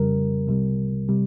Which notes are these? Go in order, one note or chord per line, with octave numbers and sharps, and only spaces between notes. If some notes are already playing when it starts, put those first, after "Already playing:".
Already playing: F2 C#3 G3 A#4
C2 C3 G3
C3 G3